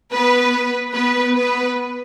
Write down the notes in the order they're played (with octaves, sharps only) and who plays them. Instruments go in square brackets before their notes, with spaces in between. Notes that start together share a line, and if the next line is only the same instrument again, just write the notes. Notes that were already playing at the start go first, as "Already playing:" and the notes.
[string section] B3 B4
B3 B4
B3 B4